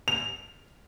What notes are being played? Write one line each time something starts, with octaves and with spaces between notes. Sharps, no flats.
F7